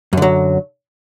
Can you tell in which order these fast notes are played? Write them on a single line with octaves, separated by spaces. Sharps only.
F#2 D3 F#3